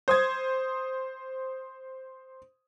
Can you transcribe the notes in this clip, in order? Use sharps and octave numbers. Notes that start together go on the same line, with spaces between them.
C5 D#6 G#6